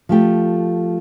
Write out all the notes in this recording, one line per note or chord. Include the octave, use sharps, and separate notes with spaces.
F3 A3 G4 A4